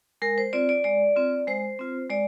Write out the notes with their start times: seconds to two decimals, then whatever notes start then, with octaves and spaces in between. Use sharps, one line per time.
0.22 G#3 A#4
0.38 C5
0.53 C4 F4 D5
0.69 D5
0.84 G#3 D5
1.16 C4 F4
1.47 G#3 C5
1.79 C4 F4
2.10 G#3 D5